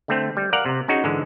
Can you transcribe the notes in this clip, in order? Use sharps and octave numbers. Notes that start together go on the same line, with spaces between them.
D3 A3 C4
G3
A#4 D5 F5 F#5
C3
C#4 D#4 F#4 G#4
G#2 D3 E3 G#3